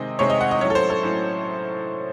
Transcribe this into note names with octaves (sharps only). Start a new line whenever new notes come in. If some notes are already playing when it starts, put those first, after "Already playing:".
Already playing: C3 D#3 G#3 C4 D#5
C3 D#3 G#3 C4 C#5
D#5
F#5
D#5
A2 F#3 C#4 C#5
A4
C5
A4
A2 F#3 C#4